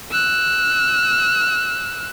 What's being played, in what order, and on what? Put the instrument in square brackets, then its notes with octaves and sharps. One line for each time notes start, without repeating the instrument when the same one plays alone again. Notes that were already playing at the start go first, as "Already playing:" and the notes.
[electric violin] E6 F#6